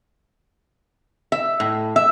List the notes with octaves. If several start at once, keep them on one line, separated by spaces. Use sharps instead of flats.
E5
A2
E5